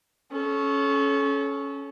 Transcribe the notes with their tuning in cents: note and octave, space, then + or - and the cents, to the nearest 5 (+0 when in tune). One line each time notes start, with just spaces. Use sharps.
C#4 +0 A4 -35